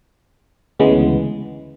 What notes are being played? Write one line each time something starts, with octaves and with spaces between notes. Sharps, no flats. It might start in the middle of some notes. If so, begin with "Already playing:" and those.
D2 C#3 E3 G#3 B3